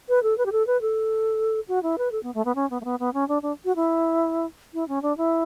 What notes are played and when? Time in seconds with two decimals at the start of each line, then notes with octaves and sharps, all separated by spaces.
0.09 B4
0.23 A4
0.38 B4
0.46 G4
0.52 A4
0.67 B4
0.81 A4
1.68 F#4
1.83 E4
1.98 B4
2.12 A4
2.23 B3
2.34 A3
2.45 B3
2.55 C#4
2.70 B3
2.81 A3
2.85 B3
3.00 B3
3.14 C#4
3.28 D4
3.42 D4
3.65 F#4
3.76 E4
4.74 E4
4.88 C#4
5.02 D4
5.17 E4